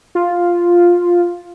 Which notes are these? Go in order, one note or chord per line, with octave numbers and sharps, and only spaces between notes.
F4